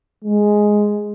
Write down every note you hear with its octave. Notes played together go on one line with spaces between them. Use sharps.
G#3